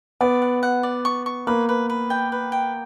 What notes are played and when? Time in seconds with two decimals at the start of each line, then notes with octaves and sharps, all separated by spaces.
0.21 B3 D5
0.42 F#5
0.63 F#5
0.83 D5
1.05 C#6
1.26 C#6
1.47 A#3 B4
1.69 B4
1.90 B4
2.10 G5
2.32 B4
2.52 G5